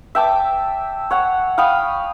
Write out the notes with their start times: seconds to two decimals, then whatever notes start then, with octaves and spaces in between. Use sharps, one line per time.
0.15 E5 G5 A5 D6
1.11 C#5 F#5
1.58 F5 G5 B5 D#6